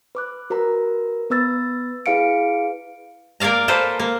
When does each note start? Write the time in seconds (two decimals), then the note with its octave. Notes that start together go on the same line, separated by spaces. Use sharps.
0.15 B4 D6 F#6
0.50 F#4 A#4 B4 A#5
1.30 B3 B4 E6 A6
2.06 E4 G#4 B4 F5 C#7 D7
3.40 A#3 A#4 D5 F5 A#5
3.68 A#3 A4 B4 C5
3.99 A#3